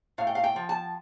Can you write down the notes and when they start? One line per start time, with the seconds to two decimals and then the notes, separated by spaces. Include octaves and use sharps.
0.18 A2 F5
0.27 G5
0.35 F5
0.44 G5
0.56 F3
0.69 A5